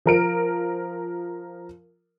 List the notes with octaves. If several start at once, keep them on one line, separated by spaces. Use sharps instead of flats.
F3 A#4 D7